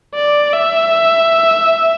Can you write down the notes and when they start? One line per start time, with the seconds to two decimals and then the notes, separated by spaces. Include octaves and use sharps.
0.14 D5
0.53 E5